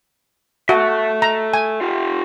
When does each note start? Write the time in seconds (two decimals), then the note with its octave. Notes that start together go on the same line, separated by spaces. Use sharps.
0.69 F#4 A4 E5
1.22 A#5
1.54 G#5
1.81 F4 G4